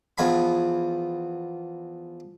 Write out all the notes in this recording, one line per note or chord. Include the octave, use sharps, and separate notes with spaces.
E2 F3 G#5 B5